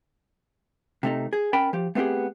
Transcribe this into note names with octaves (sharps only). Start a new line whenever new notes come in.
C3 A3 D#4
G#4
C#4 A#4 G5 A5 B5
F3 G4
A3 B3 C4 E4 G4 G#4